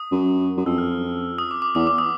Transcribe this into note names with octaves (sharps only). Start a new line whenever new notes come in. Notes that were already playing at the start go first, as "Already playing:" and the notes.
Already playing: D#6
F#2
F#2
F2 E6
F6
D#6
D6
D6
E2 D#6
D6
D#6